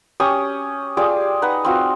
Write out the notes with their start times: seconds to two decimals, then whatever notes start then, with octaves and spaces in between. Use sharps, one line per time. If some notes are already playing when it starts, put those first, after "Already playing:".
0.20 C#4 G4 C#6 D#6
0.97 F4 G4 G#4 D5
1.42 D#4 B4 F#5
1.65 C4 F4 F#4